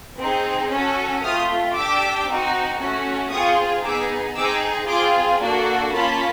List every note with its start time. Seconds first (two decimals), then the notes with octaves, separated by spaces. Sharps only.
0.18 C4 D#4 G#4
0.71 C#4 F#4 A4
1.23 A3 C4 F4 D#6 F6
1.75 D4 G4 D6 E6
2.27 C4 D#4 F#4
2.79 A3 C#4 F#4
3.31 C4 F4 G#4 C#6 D#6
3.83 B3 D#4 G#4 D6 E6
4.36 C4 D#4 G#4 D6 E6
4.88 C4 F4 G#4 C6 D6
5.40 A#3 D4 F#4 A4
5.92 A#3 C#4 F4 A5 B5